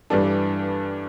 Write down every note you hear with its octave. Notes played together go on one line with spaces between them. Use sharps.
G2 E3 G3 D4 A4